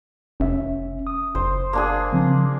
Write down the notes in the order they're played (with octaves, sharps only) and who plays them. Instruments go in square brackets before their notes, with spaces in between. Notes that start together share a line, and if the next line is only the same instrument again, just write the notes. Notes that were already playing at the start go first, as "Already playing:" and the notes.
[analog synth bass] F1 [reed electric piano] C#4 E5
[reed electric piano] D#6
[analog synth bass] F#1 [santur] C5
[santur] A#3 D4 G#4
[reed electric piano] C#3 F3 C4